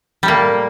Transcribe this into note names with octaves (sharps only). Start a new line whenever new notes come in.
A2 G3 A#3